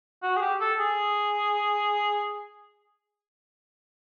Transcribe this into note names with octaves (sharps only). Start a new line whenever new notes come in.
F#4
G#4
G4
A4
G#4